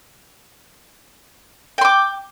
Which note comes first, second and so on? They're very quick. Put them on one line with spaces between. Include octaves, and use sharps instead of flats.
G5 C6 D6